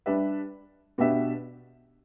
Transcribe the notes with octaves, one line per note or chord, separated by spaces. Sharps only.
G3 D4 B4 E5
B2 B3 D4 G4 E5